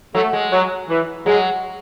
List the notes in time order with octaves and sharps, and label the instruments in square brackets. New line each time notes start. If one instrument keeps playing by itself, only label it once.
[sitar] F#3 [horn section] A3
[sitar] G#3
[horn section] F#3
E3
[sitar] F#3 [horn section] G#3